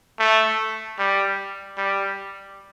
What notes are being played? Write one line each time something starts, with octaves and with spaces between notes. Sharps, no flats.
A3
G3
G3